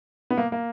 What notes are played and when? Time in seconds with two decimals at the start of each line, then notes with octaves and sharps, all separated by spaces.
0.30 B3
0.37 A#3
0.52 A#3